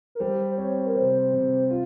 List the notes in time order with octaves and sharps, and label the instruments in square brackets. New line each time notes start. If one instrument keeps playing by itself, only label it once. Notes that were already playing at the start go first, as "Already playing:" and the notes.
[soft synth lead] A#4
[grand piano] G3 [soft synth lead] C5
[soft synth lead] C5
[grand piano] C4 [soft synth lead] C#5
[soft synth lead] A#4
[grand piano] C3 [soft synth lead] C5
[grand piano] C3
F4